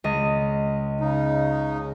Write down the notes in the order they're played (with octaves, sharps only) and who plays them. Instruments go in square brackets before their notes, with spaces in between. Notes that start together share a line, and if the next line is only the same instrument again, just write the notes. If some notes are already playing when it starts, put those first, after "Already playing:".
[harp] C#2 D#5
[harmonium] C#3 D#4